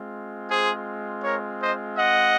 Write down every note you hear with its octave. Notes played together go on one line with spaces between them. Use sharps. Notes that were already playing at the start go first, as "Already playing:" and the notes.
Already playing: G#3 C4 F4
G#4 C5
A#4 C#5
C5 D#5
D#5 F#5